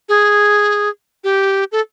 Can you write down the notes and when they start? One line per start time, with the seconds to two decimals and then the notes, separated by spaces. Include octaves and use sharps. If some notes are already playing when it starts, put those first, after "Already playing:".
0.09 G#4
1.24 G4
1.72 A4